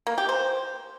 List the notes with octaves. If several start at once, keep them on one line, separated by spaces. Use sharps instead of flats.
A#3
G4
C5